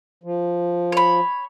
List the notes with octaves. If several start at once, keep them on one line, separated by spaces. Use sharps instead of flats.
F3
C#5 B5